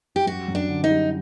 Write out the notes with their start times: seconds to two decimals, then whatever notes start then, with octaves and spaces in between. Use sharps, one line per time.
0.16 G4
0.27 F#2 F#4
0.48 F#2
0.55 D4
0.69 D3
0.84 D#4
0.90 G3